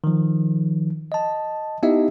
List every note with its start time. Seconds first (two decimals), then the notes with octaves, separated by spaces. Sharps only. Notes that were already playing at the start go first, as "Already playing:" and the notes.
0.04 D#3 F3
1.12 D#5 A5
1.83 B3 D#4 E4 G4 D#5 E5